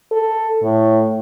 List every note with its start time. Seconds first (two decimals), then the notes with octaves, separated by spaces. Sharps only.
0.12 A4
0.63 A2